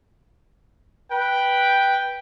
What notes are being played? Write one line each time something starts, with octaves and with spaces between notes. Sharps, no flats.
B4 G5